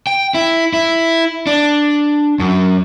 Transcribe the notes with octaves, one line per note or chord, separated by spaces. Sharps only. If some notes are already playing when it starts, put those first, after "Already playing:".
G5
E4
E4
D4
F#2